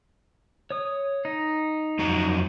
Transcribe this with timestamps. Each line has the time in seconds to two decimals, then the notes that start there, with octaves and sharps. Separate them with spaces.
0.71 C#5 D#6
1.25 D#4
1.99 F2 F#3 A#5